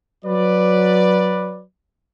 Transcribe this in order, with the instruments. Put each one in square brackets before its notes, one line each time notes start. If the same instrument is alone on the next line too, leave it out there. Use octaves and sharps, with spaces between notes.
[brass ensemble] F#3 B4 D5